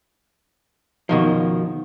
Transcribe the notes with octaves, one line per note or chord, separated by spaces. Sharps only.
B2 D#3 F3